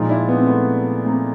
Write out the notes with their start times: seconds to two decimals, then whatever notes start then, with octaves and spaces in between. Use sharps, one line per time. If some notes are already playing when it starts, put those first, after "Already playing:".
Already playing: A#2 F3 G#3 D#4 F4
0.09 D4 E4
0.28 B3
0.38 C4
0.47 A3 B3
1.06 A#3 C4